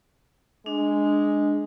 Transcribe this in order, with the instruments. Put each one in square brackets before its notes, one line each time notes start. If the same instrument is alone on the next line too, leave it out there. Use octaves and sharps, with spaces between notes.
[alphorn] G#3 [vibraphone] D4